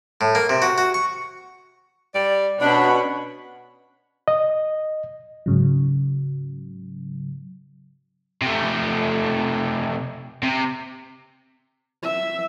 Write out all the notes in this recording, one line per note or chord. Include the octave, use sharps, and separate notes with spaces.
A2
A#3
C3
F#4
F#4
C#6
G3 D5
B2 C#4 D4 F#5 B5
D#5
G#2 C#3 F#3
C3 A3
C3
E5